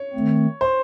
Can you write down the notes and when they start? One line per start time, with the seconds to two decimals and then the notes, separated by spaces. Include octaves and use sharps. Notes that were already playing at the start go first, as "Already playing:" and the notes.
Already playing: C#5
0.13 D#3 A3 C4
0.61 C5